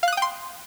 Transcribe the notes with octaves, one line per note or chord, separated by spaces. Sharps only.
F5 G5 C6 D#6 F#6